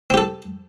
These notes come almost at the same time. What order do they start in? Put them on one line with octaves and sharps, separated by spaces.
C4 G4 A4